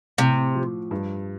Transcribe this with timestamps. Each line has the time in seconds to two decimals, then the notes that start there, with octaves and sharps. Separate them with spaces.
0.18 A2 C3
0.55 F3
0.91 G2